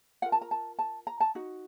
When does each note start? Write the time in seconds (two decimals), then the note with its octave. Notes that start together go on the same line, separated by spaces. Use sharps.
0.22 F4 A#4 F#5
0.32 A5
0.41 A#5
0.51 A5
0.79 A5
1.07 A#5
1.20 A5
1.35 D#4 F#4